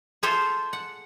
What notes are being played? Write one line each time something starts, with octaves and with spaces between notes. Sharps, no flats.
F4 G#4 A4 C5 E5 F5
F#5